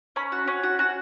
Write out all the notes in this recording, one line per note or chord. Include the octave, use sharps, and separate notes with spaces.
C#4 B5
F#4
C#4
F#4
F#4